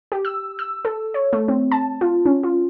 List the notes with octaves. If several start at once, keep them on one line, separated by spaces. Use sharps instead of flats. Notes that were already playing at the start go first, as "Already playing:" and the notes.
G4
E6
E6
A4
C#5
A3
C4
A5
F4
C#4
F4